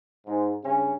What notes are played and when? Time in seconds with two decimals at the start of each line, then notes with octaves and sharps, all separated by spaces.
0.26 G#2
0.64 G2 C#3 C#4